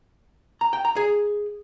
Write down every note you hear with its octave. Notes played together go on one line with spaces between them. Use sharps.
A#5
G5
A#5
G#4